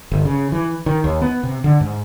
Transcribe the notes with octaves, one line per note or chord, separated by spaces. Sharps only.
G1
C#3
E3
D#3
D#2
B3
C3
D3
G#2